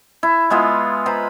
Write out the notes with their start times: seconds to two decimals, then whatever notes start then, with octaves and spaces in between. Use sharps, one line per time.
0.23 E4
0.50 G#3 B3 F4 E5
1.06 B4 C5 A#5 B5